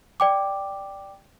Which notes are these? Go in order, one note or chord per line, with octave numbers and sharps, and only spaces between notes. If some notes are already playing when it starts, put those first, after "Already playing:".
D5 G5 D6